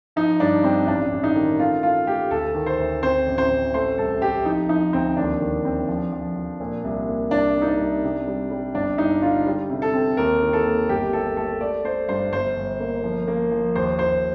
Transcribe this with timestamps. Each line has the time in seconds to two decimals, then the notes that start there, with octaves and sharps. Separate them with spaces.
0.16 F3 D#4
0.40 G2 D4
0.64 G2 C4
0.87 A1 D4
1.12 A1
1.24 D#4
1.35 D#3
1.59 A3 F4
1.83 A3 F4
2.07 A3 G4
2.31 D2 A4
2.54 D#3
2.66 C5
2.78 D2
3.02 C4 C5
3.26 A1
3.38 C5
3.50 A1
3.74 A3 C5
3.97 C2 A4
4.22 C4 G4
4.45 F3 D#4
4.69 F3 D#4
4.93 D2 C4
5.17 D#2 D4
5.40 D#3
5.65 C4
5.88 F3
6.12 F3
6.36 F3
6.60 A#2
6.84 C2
7.08 A#3
7.31 C2 D4
7.55 C2
7.62 D#4
7.68 D4
7.79 C2
8.03 C3
8.27 G3
8.51 G3
8.74 G1 D4
8.98 G2 D#4
9.22 D3 F4
9.46 G3
9.70 C3
9.82 A4
9.93 C4
10.17 D#2 A#4
10.42 D#3
10.53 A4
10.65 A#3
10.89 G1 G4
11.13 A3 A4
11.37 A3 A4
11.61 A3 D5
11.84 A3 C5
12.09 G2 C5
12.32 G1 C5
12.56 G1
12.80 A#3
13.03 F3
13.27 A#3
13.52 F3
13.75 D#2 C5
13.99 D#2 C5